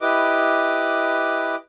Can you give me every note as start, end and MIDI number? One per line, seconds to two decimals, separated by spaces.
0.01 1.56 64
0.01 1.56 67
0.01 1.56 71
0.01 1.56 75
0.01 1.56 86